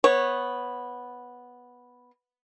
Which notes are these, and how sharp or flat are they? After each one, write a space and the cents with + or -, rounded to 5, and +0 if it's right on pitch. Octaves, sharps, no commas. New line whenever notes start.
B3 -5 C#5 -20